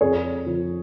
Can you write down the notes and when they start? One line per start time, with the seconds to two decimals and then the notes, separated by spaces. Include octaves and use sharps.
0.01 F2 G#4 C#5
0.46 F3